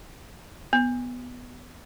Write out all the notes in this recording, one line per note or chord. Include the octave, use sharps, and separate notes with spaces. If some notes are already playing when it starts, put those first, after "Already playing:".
B3